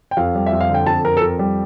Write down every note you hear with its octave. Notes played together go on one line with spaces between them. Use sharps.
G5
F2 F5
G3
E5
F2
F5
D3 G5
F2 A5
F2 A#4
A4
F2 A#4
G3